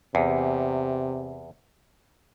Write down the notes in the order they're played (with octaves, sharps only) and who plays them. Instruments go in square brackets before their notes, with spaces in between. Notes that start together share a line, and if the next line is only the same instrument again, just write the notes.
[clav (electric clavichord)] E2 [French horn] C3